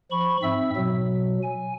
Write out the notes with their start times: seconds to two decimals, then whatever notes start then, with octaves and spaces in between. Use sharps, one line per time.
0.11 F3 B5 C#6
0.43 G#2 C4 E5 E6
0.77 B2 F#3
1.43 G#5